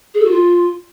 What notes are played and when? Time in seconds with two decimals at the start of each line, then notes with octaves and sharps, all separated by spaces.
0.14 G#4
0.19 A4
0.25 F#4
0.30 F4